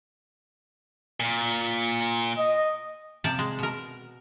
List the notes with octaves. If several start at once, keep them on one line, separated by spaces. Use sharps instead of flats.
A#2
D#5
C3 F3 D5 A5
G#3
B2 A#4